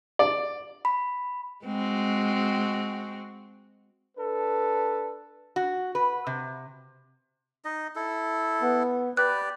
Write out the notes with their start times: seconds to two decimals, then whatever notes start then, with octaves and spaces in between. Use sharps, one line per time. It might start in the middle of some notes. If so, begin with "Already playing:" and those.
0.19 D5
0.85 B5
1.64 G#3 C4 F#4
4.18 D4 A4 B4
5.56 F#4
5.95 B4
6.27 C3
7.65 D#4 D#5
7.95 E4 A4
8.62 B3
9.17 G4 B4 D5 F#6